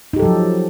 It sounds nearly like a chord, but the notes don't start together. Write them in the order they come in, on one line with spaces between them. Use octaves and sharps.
D#4 G4 A4 F#3 F3